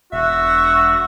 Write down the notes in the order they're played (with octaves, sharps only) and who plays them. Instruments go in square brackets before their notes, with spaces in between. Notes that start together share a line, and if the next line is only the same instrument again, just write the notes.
[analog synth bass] E1 [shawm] F#4 [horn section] E5